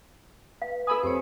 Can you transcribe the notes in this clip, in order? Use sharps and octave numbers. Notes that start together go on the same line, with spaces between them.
B4 F5
A4 G#5 B5 D#6 E6
F2 G4 A4 C5 C#5